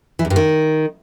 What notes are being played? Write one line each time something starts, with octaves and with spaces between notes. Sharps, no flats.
E3
E2
G2
D#3